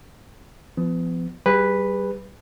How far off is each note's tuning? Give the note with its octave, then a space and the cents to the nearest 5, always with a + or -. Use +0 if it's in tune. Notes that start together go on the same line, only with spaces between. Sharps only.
F3 -20 B3 +30
G3 -25 G#4 -40 B4 +0